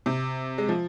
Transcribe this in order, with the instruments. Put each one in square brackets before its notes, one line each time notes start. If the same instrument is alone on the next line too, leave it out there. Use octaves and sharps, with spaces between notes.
[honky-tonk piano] C3
G#3
F3